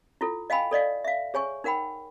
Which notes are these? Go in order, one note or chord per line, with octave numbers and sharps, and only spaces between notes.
E4 F4 A4
D#5 F5 G5 G#5 B5
A4 D5 D#5 F5
E5 F5
G#4 C#5 G#5 C#6
D#4 A#4 F#5 G5 B5